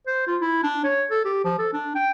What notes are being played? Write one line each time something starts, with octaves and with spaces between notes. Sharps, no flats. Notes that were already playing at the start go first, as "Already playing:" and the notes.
C5
F4
E4
D4
C#5
A4
G4
F3
A4
D4
G5